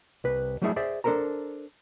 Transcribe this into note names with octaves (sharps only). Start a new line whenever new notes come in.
C2 B4
F#3 G3 A3 E4 G#4 E5
G#4 C5 D5 E5
D4 A4 A#4 C5 A#5